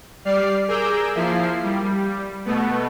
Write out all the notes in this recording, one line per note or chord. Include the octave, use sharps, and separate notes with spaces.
G3 D5 F6 C7
G#4 A#4 D6 E6 G6
F3 A#3 E4 C7
G3
B2 A3 B3